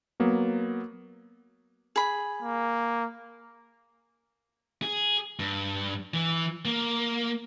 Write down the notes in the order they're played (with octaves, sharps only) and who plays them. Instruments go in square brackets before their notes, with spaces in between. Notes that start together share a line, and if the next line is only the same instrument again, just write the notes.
[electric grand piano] F#3 A#3 B3
[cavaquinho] G#4 B5
[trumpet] A#3
[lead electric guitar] G#4
G2
E3
A#3